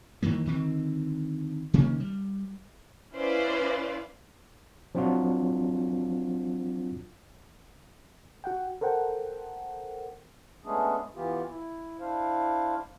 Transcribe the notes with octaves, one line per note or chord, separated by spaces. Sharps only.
F2 D#3 E3 A#3
D3 D#3 C4
C3 D#3 A#3 C#4
G3
C#4 E4 B4 C5 D5 F5
F3 F#3 C4 D4 F4 F#4
F#4 F#5 G5
A4 A#4 C5 F#5 G5
G#3 A3 B3 C#4 D4 G#4
E3 B3 F4 G4
E4
D4 E4 C5 F5